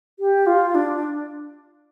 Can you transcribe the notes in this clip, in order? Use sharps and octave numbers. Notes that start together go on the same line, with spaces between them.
G4
F4
D4